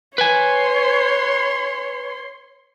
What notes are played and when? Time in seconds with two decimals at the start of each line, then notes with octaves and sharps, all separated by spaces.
0.18 B4 C#5 G#5 C6